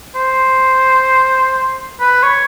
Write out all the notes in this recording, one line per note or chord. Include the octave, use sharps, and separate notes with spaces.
C5
B4
C#5